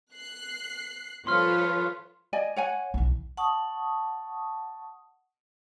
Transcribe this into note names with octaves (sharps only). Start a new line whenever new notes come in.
F#6 C7
F3 F4 A4 B4 C#5 C6 F6
D5 D#5 G#5
C#5 F#5 G#5
B1 E3
F#5 A5 C#6 D#6